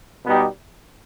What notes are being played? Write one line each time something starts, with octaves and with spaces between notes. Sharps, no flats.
B2 G3 B3 D#4 G4